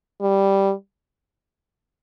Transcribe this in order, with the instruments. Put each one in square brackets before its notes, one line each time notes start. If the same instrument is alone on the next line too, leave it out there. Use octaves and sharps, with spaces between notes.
[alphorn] G3